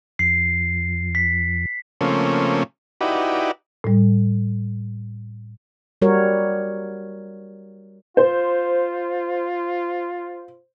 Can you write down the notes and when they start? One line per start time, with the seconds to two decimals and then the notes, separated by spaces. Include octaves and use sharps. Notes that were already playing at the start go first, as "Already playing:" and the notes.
0.19 F2 C7
1.15 B6
2.01 C#3 F3 A3 A#3 C4 C#4
3.01 D#4 E4 F#4 G4 B4 D5
3.84 A2 G3
6.02 G3 F#4 A#4 C#5
8.17 F4 C5